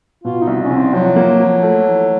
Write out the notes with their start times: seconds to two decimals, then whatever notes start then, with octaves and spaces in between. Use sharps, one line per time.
0.24 B2 F4
0.42 D#4
0.47 C2
0.64 C#4
0.70 C2
0.76 C4
0.93 F3 F#3
1.16 A#3
1.39 F3
1.63 A3
1.86 E3